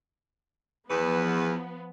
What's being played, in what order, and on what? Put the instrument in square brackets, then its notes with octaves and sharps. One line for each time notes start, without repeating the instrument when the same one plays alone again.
[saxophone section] E2 B4 [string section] F3 B3